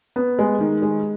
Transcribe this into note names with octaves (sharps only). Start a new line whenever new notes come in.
B3
G#3
D#3
G#3